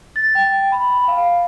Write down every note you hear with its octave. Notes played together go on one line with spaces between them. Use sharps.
A6
G5
B5
F5